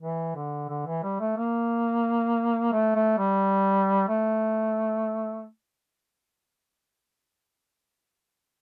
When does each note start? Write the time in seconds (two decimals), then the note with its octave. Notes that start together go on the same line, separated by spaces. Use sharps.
0.01 E3
0.36 D3
0.69 D3
0.86 E3
1.03 G3
1.20 A3
1.37 A#3
2.73 A3
2.95 A3
3.18 G3
4.09 A3